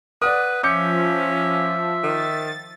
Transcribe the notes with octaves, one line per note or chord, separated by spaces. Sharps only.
B4 D5 F#5 D#6
F3 C#4 E5 D6 G6 C#7
D#3 A6